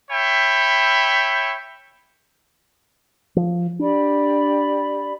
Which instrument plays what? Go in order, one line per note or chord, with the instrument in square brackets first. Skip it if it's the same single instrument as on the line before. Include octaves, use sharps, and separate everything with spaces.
[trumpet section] C#5 E5 G5 B5
[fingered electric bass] F3
[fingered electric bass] D4 [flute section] G4 D5 B5